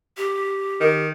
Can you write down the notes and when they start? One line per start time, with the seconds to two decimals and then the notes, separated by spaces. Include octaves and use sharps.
0.17 G4
0.81 D#3